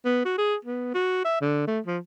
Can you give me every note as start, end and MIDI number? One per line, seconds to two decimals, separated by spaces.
0.05 0.21 59
0.25 0.34 66
0.38 0.55 68
0.65 0.93 59
0.94 1.22 66
1.24 1.41 76
1.41 1.67 50
1.67 1.80 57
1.86 1.99 53